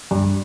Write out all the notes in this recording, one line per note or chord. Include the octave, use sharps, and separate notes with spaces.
G2